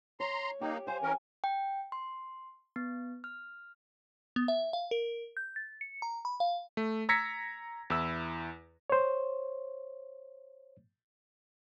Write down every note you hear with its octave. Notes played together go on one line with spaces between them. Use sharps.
C#5 A#5 C6
A#3 D#4 G4
C5 F5 G#5
E3 C#4 A#4
G5
C6
B3
F6
B3
E5
F5
A#4
G6
A6
C#7
A#5
B5
F5
A3
A#5 E6 G#6 A#6 B6 C#7
E2 E4 E6
C5 C#5